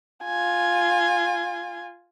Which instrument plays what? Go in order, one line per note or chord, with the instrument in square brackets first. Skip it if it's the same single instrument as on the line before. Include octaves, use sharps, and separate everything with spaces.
[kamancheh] F4 G#5